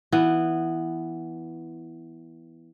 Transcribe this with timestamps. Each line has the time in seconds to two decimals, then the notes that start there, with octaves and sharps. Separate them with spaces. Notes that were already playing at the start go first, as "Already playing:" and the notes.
0.12 E3 B3